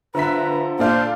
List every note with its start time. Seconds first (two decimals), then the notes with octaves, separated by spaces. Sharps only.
0.15 D3 F3 B4 E5 A#5 B6
0.79 A#2 D4 F4 A4 C5